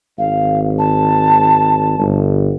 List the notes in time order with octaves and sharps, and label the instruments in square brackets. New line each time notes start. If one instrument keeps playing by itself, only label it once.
[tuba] G#1 [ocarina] F5
[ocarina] A5
[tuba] G1